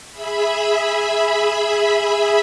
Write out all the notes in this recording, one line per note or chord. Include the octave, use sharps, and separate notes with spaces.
G#4 E5 B5